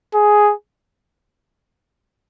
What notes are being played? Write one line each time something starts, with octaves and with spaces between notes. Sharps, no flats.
G#4